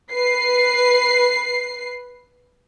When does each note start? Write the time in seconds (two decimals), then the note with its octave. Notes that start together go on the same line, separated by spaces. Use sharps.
0.12 B4 C7